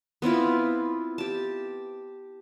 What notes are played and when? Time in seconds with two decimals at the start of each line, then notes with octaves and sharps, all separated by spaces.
0.22 B3 C4 E4 F4
1.18 G4 A5